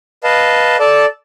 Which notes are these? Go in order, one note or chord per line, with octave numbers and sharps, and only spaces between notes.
B4 D#5 F5 A5
A4 D5 A5